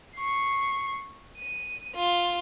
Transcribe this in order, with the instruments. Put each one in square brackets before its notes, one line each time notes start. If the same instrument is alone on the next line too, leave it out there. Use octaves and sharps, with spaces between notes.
[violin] C#6 C7
D#7
F4